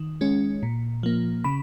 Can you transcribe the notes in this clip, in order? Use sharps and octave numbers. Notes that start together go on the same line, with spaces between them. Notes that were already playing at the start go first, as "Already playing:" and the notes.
Already playing: D#3
G#3 C#4
A#2
F3 A#3
C#3 B5